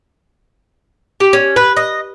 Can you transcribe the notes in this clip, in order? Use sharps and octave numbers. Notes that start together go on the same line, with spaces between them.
G4
C#4
B4
D#5